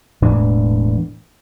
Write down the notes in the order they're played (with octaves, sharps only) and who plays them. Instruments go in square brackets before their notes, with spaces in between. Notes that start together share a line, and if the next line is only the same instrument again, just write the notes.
[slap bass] E1 A2 E3 D4